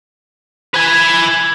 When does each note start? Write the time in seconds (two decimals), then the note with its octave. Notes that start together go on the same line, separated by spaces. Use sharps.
0.75 B4 G#5